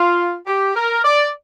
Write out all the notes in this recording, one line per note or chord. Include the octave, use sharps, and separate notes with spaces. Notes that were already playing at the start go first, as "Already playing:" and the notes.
Already playing: F4
G4
A#4
D5